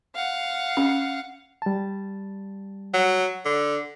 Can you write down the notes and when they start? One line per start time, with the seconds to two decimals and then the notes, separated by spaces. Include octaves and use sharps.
0.15 F5 F#5
0.77 C#4
1.62 G3 A5
2.94 F#3
3.45 D3